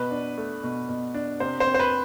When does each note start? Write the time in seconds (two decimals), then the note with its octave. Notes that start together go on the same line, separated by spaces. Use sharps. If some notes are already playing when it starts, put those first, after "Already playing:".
Already playing: B2 B4
0.11 D4
0.38 A3
0.63 B2
0.89 B2
1.14 D4
1.40 C3 C5
1.60 C5
1.67 C4
1.74 C5
1.79 B4